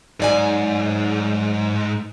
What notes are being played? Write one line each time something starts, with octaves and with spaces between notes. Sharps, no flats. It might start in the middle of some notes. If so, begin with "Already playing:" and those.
G#2 F#3 D5 G#5